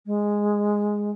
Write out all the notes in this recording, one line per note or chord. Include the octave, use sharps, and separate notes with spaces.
G#3